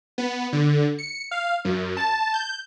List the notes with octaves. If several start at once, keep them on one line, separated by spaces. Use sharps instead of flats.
B3
D3
C#7
F5
F#2
A5
G6